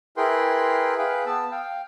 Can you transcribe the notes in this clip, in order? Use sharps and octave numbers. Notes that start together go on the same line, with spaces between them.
E4 G#4 A#4 B4 G5 C6
G#4 B4 F5 G5
B3 A5 E6
F5 G5